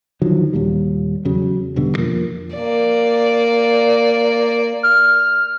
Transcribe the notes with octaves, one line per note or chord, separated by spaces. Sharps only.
D3 D#3 F3 F#3
D#2 A#2 G3
E2 C#3 F#3
E1 G2 B2 D3
F2 F3 A#3
A#3 D5
F6